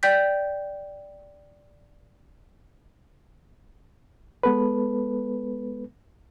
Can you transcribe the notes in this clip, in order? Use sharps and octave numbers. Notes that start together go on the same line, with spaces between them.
D5 G5 G6 B6
G#3 B3 A4 B4